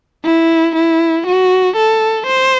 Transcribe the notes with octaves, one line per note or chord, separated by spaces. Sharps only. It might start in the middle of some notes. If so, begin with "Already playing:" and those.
E4
E4
F#4
A4
C5